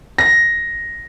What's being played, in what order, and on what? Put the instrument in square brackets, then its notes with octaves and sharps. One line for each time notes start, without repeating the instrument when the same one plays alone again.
[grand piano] A#6